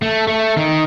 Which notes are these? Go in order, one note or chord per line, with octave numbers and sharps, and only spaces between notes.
A3
A3
D#3